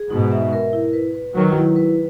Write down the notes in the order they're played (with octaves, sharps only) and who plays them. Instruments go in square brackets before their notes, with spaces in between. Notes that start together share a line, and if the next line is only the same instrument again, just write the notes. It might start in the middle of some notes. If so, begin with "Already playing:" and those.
Already playing: [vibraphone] G#4
[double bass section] G#2 B2 [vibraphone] D#4
[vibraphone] E5
A#4
E4
B4
B4
[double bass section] D#3 F#3 [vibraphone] B4
[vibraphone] E4
B4